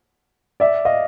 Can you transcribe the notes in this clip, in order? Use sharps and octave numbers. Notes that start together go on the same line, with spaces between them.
D5 E5
D#5 F5